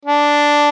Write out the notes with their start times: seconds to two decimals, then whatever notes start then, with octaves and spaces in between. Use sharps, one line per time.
0.05 D4